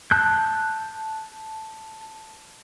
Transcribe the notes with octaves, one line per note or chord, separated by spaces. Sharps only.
A5 F#6 G6